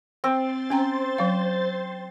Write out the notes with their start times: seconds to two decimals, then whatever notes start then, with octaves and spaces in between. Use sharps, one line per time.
0.24 C4 C5 C6 A6
0.70 C#4 G5 A#5
1.18 F#3 F5